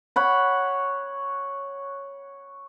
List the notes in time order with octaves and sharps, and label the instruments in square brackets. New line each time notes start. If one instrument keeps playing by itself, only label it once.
[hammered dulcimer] C#5 F#5 B5